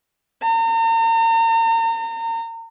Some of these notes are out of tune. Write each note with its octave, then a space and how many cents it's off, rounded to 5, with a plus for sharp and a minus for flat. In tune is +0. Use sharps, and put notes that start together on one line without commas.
A#5 -40